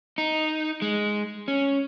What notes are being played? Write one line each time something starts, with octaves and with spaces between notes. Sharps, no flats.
D#4
G#3
C#4